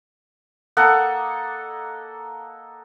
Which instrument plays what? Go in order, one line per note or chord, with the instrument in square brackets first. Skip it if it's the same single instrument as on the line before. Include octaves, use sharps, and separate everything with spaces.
[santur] A#3 A4 D#5 F#5